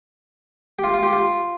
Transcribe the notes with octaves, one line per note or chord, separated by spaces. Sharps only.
G4
F4
F4
G4
F4